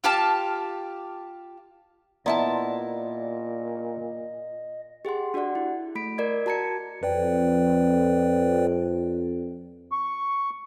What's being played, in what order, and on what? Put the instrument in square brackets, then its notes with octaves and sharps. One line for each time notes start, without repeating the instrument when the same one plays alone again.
[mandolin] F4 G4 F5 A5
[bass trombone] A#2 [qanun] B3 E4 A5 [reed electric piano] D5 A#5 C6 [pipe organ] D#5
[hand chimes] G4 G#4 F#5 C6
D4 F#4 G4 D5 F#5
E4
A3 B5 B6 D7
A#4 D5 D#5 G#6
F#4 A5 A#5 G#6 C#7
[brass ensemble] F2 [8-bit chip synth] B4 D5 G5
[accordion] C#6